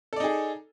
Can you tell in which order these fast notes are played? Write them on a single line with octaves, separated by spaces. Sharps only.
A4 D5 D#4 G#4